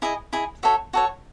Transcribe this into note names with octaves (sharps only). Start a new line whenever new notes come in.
E4 G#4 D#5
E4 G#4 D#5
F#4 A4 C#5 E5
F#4 A4 C#5